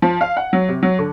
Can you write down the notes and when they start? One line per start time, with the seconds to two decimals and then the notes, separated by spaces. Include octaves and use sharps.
0.02 F3
0.21 F5
0.37 F#5
0.53 F#3
0.69 C3
0.83 F#3
0.99 D3